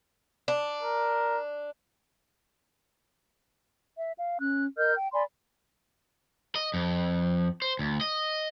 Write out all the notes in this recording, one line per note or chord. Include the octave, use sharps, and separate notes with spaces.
D4
A#4
E5
F5
C#4 F#6
A#4 D#5 F6 G6
G5
D5 G#5 B5 C6
D#5
F2
C5
D2
D#5